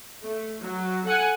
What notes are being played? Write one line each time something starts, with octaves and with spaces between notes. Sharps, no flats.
A3
F#3
A4 F#5 G#5